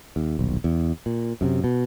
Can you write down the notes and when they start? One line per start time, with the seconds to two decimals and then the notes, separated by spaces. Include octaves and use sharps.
0.16 D#2
0.39 D#1 B1
0.64 E2
1.06 A#2
1.41 F#2 A2 C3
1.64 B2